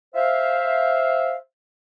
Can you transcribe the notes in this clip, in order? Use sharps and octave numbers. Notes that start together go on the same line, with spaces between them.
C5 E5 F5